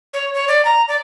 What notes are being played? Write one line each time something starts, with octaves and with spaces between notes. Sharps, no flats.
C#5
C#5
D5
A#5
D5